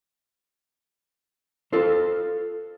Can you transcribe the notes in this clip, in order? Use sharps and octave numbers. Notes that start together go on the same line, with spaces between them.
F4 A4 C5